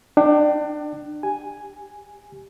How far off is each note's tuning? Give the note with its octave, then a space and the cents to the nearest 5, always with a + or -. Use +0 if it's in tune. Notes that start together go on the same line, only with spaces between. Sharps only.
D4 +25 G5 -20
G4 +0 G#5 +0